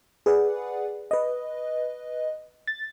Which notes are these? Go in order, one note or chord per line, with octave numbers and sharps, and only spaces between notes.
G#4 B4 D5 F#5
B4 D#5
A6